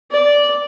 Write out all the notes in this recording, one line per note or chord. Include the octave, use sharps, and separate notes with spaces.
D5